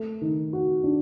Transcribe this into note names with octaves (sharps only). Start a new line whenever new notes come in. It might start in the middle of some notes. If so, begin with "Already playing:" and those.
Already playing: A3
D#3
F#4
D4